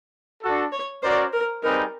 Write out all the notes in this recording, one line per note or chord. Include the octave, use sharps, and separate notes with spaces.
D4 F#4 A4
C#5
C#4 F#4 A#4 C5 D5
A#4
G3 C4 D#4 G#4 A#4 B4